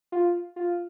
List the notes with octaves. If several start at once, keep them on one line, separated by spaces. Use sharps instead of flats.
F4
F4